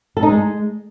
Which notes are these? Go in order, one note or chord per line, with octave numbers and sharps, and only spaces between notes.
A4
D#4
G#3